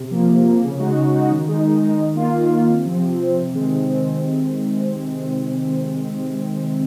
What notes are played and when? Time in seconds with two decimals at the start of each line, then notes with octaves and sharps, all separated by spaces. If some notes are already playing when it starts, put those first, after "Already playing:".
Already playing: C3
0.11 F3 A#3
0.28 C3
0.45 F3 A#3
0.62 C#3
0.79 G#3 D#4 F#4
0.97 C#3
1.13 G#3 D#4 F#4
1.31 D#3
1.48 G#3 D#4
1.65 D#3
1.83 G#3 D#4
2.00 D#3
2.16 A#3 F4
2.33 D#3
2.51 A#3 F4
2.68 C3
2.85 F3 C4
3.02 C3
3.19 F3 C4
3.37 C3
3.54 D#3 G#3 C4
3.71 C3
3.88 D#3 G#3 C4